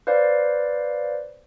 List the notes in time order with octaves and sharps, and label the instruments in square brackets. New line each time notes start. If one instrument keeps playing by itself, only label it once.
[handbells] B4 C5 D5 F5